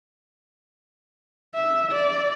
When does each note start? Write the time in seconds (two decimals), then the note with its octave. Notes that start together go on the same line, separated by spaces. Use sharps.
1.55 E5
1.92 D5